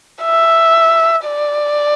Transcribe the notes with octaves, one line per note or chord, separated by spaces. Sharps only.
E5
D5